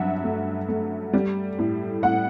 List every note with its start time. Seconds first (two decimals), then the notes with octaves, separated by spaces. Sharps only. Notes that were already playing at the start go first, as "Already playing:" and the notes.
Already playing: G2 F#3 E5 F#5
0.24 A3
0.69 A3
1.13 G3
1.59 A2
2.03 A2 F#5